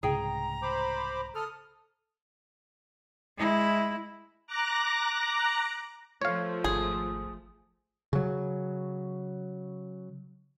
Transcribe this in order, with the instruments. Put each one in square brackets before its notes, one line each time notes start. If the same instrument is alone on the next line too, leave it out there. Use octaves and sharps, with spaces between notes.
[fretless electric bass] C2 G#2 C#3 [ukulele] G#4 G5 [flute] A#5
[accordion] C5 B5 D6
[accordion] A4 F6 [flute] D#6
[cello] G#3 E4
[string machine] A#5 D6 F#6 A#6
[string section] F3 A3 [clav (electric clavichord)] C#5 F5
[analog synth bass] G#1 [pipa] G#4
[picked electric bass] C#3 F#3